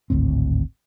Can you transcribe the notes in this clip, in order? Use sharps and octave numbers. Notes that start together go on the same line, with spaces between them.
G#1 D2 A2 C4